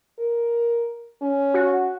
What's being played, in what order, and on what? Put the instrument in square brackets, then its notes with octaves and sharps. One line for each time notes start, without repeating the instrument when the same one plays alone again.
[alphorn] A#4
C#4
[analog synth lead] F#4